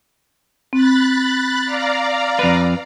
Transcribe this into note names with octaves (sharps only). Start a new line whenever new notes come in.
C4 B5 F#6 A6
D5 F5 A#5
F2 B4